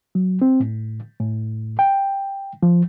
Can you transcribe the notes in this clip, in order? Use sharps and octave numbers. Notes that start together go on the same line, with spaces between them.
F#3
C4
A2
A2
G5
F3